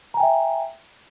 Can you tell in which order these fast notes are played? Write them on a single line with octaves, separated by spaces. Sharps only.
A#5 G#5 G5 E5